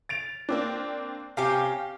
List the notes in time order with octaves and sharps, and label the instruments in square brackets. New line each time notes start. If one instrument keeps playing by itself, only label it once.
[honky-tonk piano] A6 D7 F7
A#3 C4 D4
[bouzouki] C3 C#4 G4 [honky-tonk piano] F5